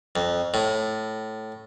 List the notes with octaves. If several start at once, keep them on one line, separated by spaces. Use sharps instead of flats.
F2
A2